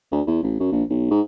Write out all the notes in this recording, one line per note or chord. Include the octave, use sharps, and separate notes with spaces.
D2
E2
A1
F#2
A#1
B1
G#2